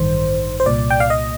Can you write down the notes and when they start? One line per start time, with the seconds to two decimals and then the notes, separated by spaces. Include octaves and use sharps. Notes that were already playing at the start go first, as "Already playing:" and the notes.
Already playing: A1 G2 D#3 C5
0.60 C5
0.66 C2 A#2 D5
0.90 G5
1.00 F5
1.10 D#5